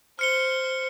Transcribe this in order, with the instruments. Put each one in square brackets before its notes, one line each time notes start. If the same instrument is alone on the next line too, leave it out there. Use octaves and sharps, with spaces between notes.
[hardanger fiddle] C5 [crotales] F6 C#7 G7